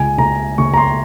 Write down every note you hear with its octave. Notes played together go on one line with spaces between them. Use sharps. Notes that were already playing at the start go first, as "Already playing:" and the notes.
Already playing: C#2 G#5
C#2 A#5
C#3 C#6
A#5
C6